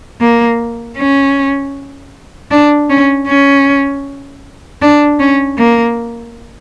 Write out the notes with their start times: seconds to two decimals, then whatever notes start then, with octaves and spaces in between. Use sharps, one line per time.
0.21 A#3
0.97 C#4
2.51 D4
2.90 C#4
3.28 C#4
4.82 D4
5.19 C#4
5.58 A#3